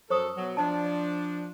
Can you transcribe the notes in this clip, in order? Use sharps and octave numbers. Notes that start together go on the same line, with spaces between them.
F#2 A4 C5 C#6 D#6
B2 F#3
F3 D4 D#5 A5
D#5